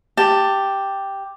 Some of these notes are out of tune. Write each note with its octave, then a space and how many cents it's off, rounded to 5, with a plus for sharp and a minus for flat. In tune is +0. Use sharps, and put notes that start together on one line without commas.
G4 +0 A5 +10